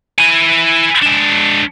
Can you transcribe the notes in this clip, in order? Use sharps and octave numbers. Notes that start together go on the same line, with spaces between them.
E4 G#5
G#3 D4